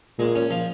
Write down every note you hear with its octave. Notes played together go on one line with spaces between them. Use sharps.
A#2 G#3
C#4
F3